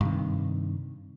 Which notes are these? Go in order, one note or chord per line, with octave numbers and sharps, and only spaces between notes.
G2 C3 D#3